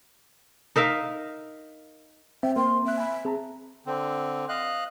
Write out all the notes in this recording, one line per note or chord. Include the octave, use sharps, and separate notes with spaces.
D#4 A#4 E5 F5
C4 C5 E5 G5
A#3 A#4 C5 G5 C6
C4 E5 F#6
G#5 B5
C4 G#4 A5 A#5
D3 C4
D#5 F5 F#6